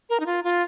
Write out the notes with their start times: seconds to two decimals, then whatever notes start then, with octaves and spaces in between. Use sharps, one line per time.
0.10 A#4
0.20 D#4
0.26 F4
0.44 F4